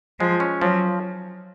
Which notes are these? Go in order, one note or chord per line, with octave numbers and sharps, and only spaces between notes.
F3 G#3
C#4
F3 F#3